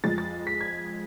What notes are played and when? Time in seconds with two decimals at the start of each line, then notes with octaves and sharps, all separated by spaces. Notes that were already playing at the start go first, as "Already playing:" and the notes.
0.04 F2 F3 G#3 A6
0.18 A6
0.47 B6
0.61 G#6